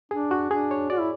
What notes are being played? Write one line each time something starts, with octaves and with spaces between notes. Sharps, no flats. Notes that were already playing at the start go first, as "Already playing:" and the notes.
D4 G#4
F#4
D4 G#4
C#5
F#4 D5
E4